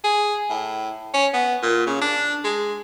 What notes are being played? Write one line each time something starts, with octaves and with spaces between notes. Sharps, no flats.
G#4
A2
C#4
B3
A#2
C#3
D4
G#3